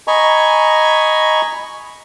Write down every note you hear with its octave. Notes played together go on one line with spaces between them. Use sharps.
D#5 G#5 A#5 B5 C#6